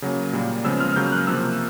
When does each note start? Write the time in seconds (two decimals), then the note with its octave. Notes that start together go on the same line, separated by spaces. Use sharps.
0.02 C#3 F#3 A#3
0.33 A#2 G3 A#3
0.65 C#3 F3 G#3 B3 E6
0.80 F6
0.96 C#3 F#3 A#3 G6
1.06 F6
1.12 F#6
1.27 C3 F3 A#3 E6